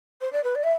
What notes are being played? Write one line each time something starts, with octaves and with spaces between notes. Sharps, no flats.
C5
D5
B4
D5
E5